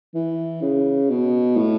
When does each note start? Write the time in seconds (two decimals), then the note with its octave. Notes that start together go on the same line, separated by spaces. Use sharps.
0.14 E3
0.62 C#3
1.09 B2
1.57 A2